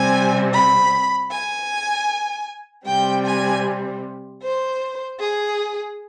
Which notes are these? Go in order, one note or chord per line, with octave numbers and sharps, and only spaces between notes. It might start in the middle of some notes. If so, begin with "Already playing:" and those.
Already playing: C3 G3 C4 G#5
B5
G#5
C3 G3 C4 G5
G#5
C5
G#4